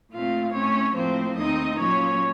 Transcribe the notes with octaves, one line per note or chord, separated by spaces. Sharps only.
A#2 A3 C4 F4 F5
A2 A3 C4 C#4 C#5
A2 F3 A#3 C4 C5
D#2 D#3 A3 C4 D#4 D#5
A#2 F#3 A#3 C#4 C#5